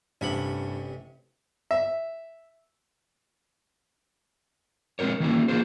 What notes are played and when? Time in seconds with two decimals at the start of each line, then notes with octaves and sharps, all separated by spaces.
0.21 A1 G2 C3 B5 F#7
1.71 E5
4.99 G#3 C4 D#4 A#4 C#5
5.20 D#3 E3 G3 A#3 C#4 E4
5.48 A#3 B3 F4 G#4 C5